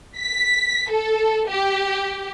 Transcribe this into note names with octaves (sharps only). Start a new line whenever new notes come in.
B6
A4
G4